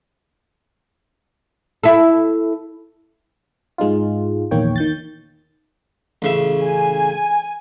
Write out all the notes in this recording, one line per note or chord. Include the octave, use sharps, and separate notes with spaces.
E4 A4
G#2 G#3 D#4 F4
A#1 E2 D#3 A#3 C#5 G5
D#3 G6 A6
A1 C#3 E5
G#5